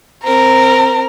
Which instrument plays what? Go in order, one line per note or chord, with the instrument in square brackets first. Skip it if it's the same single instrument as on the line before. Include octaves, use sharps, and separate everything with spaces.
[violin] C4 A#4 [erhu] A#5